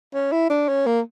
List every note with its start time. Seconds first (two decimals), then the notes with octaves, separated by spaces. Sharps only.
0.14 C#4
0.32 E4
0.50 D4
0.68 C#4
0.86 A#3